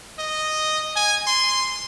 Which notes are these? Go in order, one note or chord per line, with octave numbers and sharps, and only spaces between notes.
D#5
G#5
C6